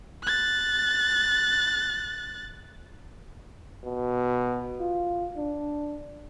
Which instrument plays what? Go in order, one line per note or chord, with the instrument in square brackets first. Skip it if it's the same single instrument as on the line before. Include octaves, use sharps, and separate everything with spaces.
[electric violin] F#6 A6
[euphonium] B2
F4
D4